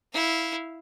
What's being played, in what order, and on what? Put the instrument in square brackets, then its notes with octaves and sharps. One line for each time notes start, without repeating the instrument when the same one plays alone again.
[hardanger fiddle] E4 F5